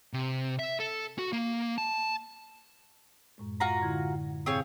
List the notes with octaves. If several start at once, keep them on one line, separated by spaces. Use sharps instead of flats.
C3
E5
A4
F#4
A#3
A5
F#2 A2 G#3
F4 F#4 A#5
D3 E4 G#6
G#2 B2 C4 G#4 C#5 F5